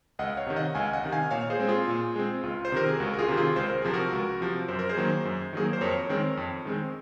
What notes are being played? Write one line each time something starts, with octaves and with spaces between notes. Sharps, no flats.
C#2 D#5 F#5
C#5 F5
C3 D#3
D#5 F#5
C#2 F5 G#5
D#5 F#5
C3 D#3
F5 G#5
A#2 C#5 F5
G#4 C5
G#3 C4
F4 G#4
A#2
G#3 C4
C#2 F4
C5
C3 D#3 A#4
G#4
C#2 F#4
A#4
F4 G#4
C3 D#3
F4 G#4
C#2 C5
A#4
C3 F3 G#4
F#4 A#4
C#2
C3 F3
F#2 C5
A#4
G#4 C5
D#3 F#3 A#3
F#2
D#3 F#3 A#3 G#4
A#4
C5
F2 A#4 C#5
D#3 G#3 C4
F2
D#3 G#3 C4